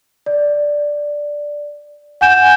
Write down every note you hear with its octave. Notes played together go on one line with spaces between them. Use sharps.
D5
F#5 G#5 G6 E7